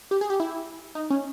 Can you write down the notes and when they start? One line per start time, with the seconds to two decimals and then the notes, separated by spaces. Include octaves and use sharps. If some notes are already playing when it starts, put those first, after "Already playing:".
0.11 G4
0.21 G#4
0.30 G4
0.40 E4
0.95 D#4
1.10 C#4